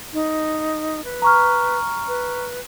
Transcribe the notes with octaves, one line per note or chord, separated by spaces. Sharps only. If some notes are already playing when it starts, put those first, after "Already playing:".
D#4
B4
A#5 C#6 F6
B4